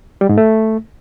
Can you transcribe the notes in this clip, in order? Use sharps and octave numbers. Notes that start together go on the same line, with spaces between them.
G3
G#2
A3